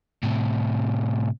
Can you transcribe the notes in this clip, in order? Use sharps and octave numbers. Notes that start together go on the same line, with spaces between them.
A2 C3